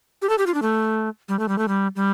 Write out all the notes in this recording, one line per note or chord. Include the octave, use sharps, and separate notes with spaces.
G4
A4
G4
F4
D4
A3
G3
A3
G3
A3
G3
G3